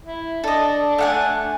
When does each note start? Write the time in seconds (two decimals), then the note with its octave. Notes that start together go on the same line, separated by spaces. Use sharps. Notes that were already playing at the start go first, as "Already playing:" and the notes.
0.03 E4
0.44 D4 A4 D#5
0.98 A3 F#5 G#5